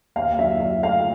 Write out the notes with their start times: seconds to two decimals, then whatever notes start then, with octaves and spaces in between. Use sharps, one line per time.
0.16 D#2 F5
0.38 F#3 E5
0.60 F#3 E5
0.83 A3 F5